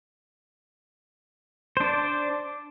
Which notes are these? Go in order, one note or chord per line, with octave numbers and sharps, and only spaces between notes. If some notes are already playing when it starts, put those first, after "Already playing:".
D4 C5 D5